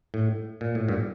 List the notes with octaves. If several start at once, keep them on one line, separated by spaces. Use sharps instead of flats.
A2
A#2
A2
G2 A#2